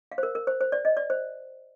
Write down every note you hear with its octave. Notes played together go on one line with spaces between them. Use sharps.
F5
C5
A#4
A#4
C5
C5
D5
D#5
D5
C5